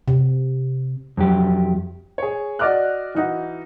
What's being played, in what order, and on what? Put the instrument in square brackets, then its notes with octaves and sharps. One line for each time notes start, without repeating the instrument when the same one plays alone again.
[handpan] C3
[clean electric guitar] F2 F#3 G4
[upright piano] G#4 C#5
F#4 D5 D#5 D6 F6 F#6
E3 D#4 F#4